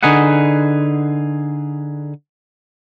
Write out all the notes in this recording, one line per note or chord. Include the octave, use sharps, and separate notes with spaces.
D3 D#4 G#4 B4 F#5